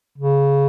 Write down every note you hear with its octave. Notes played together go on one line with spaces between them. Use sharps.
C#3